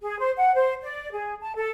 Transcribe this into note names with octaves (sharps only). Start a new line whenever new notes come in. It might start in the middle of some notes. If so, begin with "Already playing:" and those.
G#4
C5
F#5
C5
D5
G#4
A5
A4